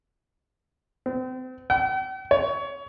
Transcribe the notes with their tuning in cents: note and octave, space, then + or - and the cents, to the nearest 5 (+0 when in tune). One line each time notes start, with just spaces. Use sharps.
C4 -35
G5 -45
C#5 +20